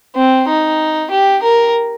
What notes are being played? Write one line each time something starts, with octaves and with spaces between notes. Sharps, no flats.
C4
D#4
G4
A#4